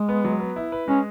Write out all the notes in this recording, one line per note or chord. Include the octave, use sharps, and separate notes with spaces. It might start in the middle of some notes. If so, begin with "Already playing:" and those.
Already playing: G#3
B3
F#3
B3
E4
B4
G#3 C#4